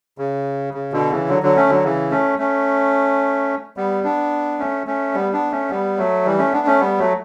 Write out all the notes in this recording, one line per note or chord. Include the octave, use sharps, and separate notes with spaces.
C#3
C#3
B2 D3
C#3 E3
D3 F#3
D3 F#3
A3 C#4
D3 F#3
C#3 E3
A3 C#4
A3 C#4
G3 B3
B3 D4
A3 C#4
A3 C#4
G3 B3
B3 D4
A3 C#4
G3 B3
F#3 A3
E3 G3
A3 C#4
B3 D4
A3 C#4
G3 B3
F#3 A3